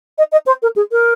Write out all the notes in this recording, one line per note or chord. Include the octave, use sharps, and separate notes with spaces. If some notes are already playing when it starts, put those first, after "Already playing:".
D#5
D#5
C5
A#4
G#4
A#4